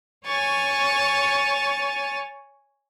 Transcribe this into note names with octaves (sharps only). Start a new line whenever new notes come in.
C#5 G#5 C#6 A6